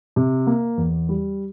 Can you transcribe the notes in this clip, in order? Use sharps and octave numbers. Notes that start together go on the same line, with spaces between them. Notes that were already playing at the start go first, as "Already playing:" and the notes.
C3
A#3
E2
G3